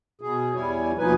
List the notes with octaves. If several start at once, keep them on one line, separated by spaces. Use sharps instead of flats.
B2 G#4
E2 G3 E4 C#5 G#5
D#2 B2 F3 D#4 B4 G#5